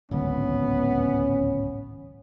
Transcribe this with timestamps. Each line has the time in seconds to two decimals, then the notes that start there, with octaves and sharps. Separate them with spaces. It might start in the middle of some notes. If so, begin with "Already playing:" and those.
0.11 D1 G#1 C#2 B3 C#4